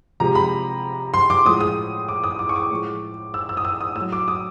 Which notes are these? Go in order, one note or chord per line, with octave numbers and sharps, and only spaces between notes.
C3 F3 G#3 A#5
B5
C6
D6
A2 F3 G#3 D#6
D#6
D6
D#6
D6
C#6
D6
A2 F3 G#3
E6
E6
D#6
E6
D#6
A2 E6
F#3
D6
D#6